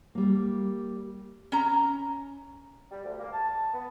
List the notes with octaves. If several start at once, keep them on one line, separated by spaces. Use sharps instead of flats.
G3 A#3
C#4 A#5
G3
D2
A#3
A5
B3